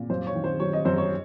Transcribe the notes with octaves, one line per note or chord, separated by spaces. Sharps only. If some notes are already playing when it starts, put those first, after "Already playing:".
Already playing: A#2
F#2 C5
C#5
D#3
C5
F#3 C#5
D#5
F#2 C5
C#5